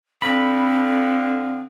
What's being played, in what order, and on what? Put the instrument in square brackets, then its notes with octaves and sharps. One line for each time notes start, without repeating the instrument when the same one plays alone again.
[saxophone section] D3 F3 [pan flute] C4 [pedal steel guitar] B5